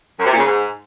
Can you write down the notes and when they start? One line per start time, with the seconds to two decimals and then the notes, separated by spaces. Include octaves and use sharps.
0.19 F#2
0.25 C3
0.32 A#2
0.38 C#3
0.44 G#2